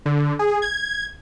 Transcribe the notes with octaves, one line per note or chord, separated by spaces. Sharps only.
D3
G#4
G#6